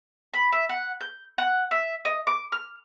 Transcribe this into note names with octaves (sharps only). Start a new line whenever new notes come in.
B5
E5
F#5
G6
F#5
E5
D#5
D6
F6